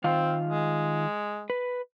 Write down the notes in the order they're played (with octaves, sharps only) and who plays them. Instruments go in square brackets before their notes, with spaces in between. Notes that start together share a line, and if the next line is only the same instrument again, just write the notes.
[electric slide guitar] D#3 F4 F5 [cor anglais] C4
[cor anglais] G#3
[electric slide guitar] B4